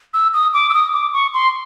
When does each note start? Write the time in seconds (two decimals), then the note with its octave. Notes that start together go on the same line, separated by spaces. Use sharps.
0.14 E6
0.34 D#6
0.53 D6
0.70 E6
0.74 D#6
0.93 D6
1.13 C#6
1.34 C6